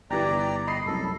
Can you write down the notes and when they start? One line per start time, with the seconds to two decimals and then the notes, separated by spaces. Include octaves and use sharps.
0.11 G1 E3 G4 D5 A#5
0.67 D#5 B5 C7
0.86 F1 C2 F#2 A4